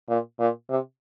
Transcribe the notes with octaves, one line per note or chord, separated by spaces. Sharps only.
A#2
A#2
C3